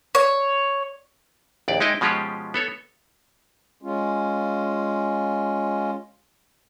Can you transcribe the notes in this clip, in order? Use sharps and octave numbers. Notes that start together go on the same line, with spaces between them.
C#5
A#1 D#2 D5
G#3 D#4 E4 D#5 G5
B2 F3 G#3 C#4 F4 G4
B3 A4 C#5
G#3 C#4 F4